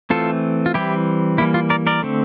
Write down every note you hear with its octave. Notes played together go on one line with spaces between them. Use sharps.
E3 A3 C4 F4 A4
F4
E3 G3 C4 E4 G4
E3 G3 A#3 E4
F4
A#4 D5
A#4 D5
D3 A3 C4